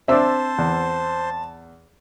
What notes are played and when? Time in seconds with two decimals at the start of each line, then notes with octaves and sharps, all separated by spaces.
0.08 C4 D4 C5 E5 A5 E6
0.58 E2